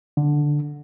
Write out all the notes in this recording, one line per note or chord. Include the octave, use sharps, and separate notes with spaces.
D3